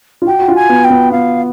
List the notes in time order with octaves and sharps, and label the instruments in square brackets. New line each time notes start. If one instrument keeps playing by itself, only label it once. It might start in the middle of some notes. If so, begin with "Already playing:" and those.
[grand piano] F4
[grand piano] F#4 [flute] G5
[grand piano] F#4
F4
[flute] G#5
[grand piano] B3
[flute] G5
[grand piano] B3
[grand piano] B3 [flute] F5